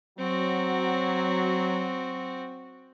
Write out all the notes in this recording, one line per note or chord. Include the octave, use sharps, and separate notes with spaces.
F#3 C4 F#4